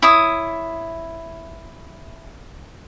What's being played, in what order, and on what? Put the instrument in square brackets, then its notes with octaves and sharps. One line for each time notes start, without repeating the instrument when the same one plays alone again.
[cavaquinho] E4 C#5 D#6